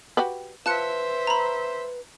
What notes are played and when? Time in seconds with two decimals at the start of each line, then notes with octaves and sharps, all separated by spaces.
0.17 F#4 G4 B4
0.66 F4 B4 C5 E5 A5 F#6 C#7
1.27 A#5 B5